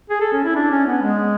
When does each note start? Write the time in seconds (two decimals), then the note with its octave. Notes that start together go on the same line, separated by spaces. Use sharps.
0.10 G#4
0.20 A4
0.33 C#4
0.44 E4
0.55 D4
0.71 C#4
0.86 B3
1.02 G#3